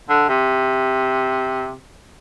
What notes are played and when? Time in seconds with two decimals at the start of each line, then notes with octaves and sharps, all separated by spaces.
0.09 D3
0.29 C3